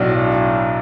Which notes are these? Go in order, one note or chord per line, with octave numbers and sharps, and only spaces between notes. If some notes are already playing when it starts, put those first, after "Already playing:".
Already playing: B1 A2 F#3 D4